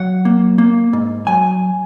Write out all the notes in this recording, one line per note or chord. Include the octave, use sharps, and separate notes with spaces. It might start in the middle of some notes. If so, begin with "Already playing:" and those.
Already playing: F#3 F#5
A#3
A#3
G#2
F#3 G#5